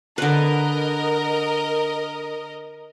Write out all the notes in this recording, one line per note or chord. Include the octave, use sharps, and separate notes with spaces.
D3 A#4 B4 D#5